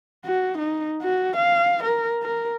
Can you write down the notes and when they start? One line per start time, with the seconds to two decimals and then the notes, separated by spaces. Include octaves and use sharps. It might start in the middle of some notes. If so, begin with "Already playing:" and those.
0.25 F#4
0.58 D#4
1.02 F#4
1.37 F5
1.84 A#4
2.23 A#4